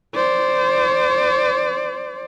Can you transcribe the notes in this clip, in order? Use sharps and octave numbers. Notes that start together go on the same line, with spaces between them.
C5 D5